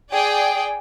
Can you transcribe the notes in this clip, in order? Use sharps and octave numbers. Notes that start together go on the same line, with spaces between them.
G#4 D5 G5